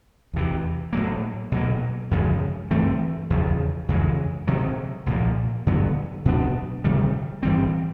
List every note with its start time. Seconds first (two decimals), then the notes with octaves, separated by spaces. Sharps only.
0.33 E2 C3 E3
0.93 A2 F#3 A#3
1.52 B2 F#3 A#3
2.11 F#2 C#3 F3 G#3
2.71 G2 E3 A3 C4
3.30 E2 C#3 F3
3.88 F2 C#3 E3 G#3
4.48 C3 D#3 F#3
5.06 C2 A#2 F3 A#3
5.66 G2 D3 F#3 B3
6.25 B2 F#3 B3 D4
6.84 C3 D#3 G3
7.43 G2 E3 G3 C4